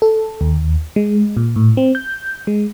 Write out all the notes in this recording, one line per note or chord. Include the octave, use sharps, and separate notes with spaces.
A4
D#2
G#3
A#2
A2
C4
G6
G#3